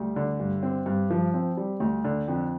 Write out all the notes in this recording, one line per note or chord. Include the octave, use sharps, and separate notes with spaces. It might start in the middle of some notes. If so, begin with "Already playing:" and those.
Already playing: D2 G3
D3
G2
C4
G2
F3
C4
G3
D2
D3
F2